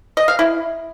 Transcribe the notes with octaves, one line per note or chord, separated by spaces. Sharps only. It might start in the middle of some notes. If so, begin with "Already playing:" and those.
D#5
F5
E4